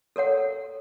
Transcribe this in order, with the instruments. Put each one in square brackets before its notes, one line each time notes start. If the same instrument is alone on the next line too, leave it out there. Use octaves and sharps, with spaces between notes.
[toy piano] A4 A#4 C#5 F#5